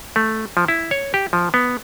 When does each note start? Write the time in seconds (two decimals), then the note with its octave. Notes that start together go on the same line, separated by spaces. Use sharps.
0.16 A3
0.57 F3
0.68 E4
0.91 C#5
1.14 G4
1.33 F3
1.54 B3